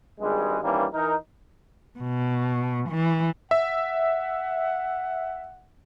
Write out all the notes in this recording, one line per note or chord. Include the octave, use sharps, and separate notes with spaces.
G#1 G2 G3 G#3
G2 D#3 E3 G3 A#3 C#4
E3 D#4 A#4
B2
E3
E5 F#5